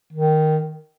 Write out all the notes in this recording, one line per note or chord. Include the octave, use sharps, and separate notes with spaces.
D#3